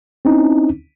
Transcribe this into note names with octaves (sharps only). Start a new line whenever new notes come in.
C4 C#4 D#4 E4